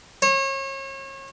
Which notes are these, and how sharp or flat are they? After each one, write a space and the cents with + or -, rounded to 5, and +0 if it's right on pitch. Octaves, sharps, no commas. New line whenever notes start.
C#5 -35